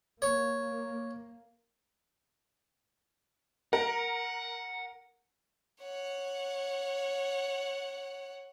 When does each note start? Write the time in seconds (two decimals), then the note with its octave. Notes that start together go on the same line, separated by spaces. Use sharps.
0.22 A#3 C#5
3.73 A#4 F#5
5.82 C#5 F#5